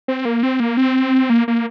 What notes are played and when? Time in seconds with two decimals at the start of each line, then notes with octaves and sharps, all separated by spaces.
0.08 C4
0.25 A#3
0.43 C4
0.60 A#3
0.77 C4
1.30 A#3
1.48 A#3